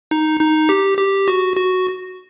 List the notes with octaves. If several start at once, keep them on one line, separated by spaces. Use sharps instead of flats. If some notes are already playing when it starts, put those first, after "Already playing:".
D#4
D#4
G4
G4
F#4
F#4